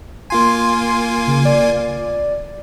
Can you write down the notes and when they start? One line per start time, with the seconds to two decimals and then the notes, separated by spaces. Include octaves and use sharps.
0.30 A#3 F4 G#5 C6
1.27 C#3
1.45 D5